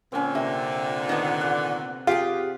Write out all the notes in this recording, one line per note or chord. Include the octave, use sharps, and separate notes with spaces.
A#2 D3 C4 C#4
C3 A#3 G5
D#3 B3
D5 F#5
F4 G4 G#4